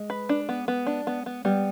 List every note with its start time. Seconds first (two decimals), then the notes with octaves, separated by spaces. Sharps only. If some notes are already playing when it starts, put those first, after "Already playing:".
Already playing: G#3
0.10 B4
0.29 D4
0.49 B3
0.68 B3
0.86 D4
1.07 B3
1.26 B3
1.45 G3 B3